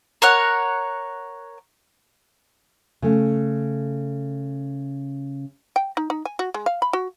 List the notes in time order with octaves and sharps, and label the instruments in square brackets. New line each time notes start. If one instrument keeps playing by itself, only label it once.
[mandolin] A#4 C#5 F#5
[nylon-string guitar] C#3 A3
[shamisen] G5
D#4
D#4
G#5
F#4
G#3
F5
B5
F#4